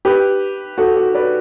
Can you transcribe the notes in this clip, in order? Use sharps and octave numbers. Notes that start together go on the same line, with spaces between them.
G4 B4
F#4 A4
F#4
B4 D5